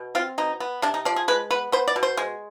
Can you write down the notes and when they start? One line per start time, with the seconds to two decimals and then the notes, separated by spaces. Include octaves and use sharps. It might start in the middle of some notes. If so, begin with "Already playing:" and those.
Already playing: B2
0.15 C4 F4
0.38 B2 D#4
0.60 B3
0.82 C3 D4
0.94 D#4
1.05 F3 D5
1.16 G#4
1.28 G#3 B4
1.50 B3 B4
1.72 B3 C5
1.88 D5
1.96 B2
2.03 C5
2.17 G#3